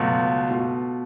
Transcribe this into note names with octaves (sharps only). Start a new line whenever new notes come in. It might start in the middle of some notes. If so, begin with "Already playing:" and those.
Already playing: C#2 B2 F#3 A3
B2 A3 F4